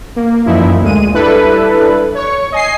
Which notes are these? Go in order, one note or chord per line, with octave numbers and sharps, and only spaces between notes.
A#3
F#2 A#2 E3 F3 D#4 E4
D2 A#2 G#3 D#7
G3 D4 E4 A4 B4
C#5 C#6
D#5 G#5 C7